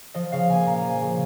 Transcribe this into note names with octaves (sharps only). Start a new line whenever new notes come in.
F3 D#5
C#3 F5
A#3 G#5
A#2 A#5
F3 G#5
C#3